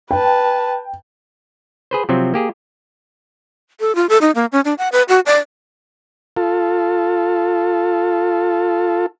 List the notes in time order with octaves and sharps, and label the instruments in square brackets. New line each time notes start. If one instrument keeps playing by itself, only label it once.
[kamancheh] B4 A5 [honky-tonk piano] G5
[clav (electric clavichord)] G#4 B4 C5
C3 F3 F#3 C4
A#3 G4 G#4
[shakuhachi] A4
F4
A4
D#4
A#3
C#4
D4
F#5
B4
F#4
D5
[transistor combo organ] F4 A4